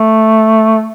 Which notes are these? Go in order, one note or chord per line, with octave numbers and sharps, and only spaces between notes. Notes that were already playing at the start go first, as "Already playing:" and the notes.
Already playing: A3